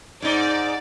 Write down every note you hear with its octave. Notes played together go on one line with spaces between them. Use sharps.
G#2 D#4 D5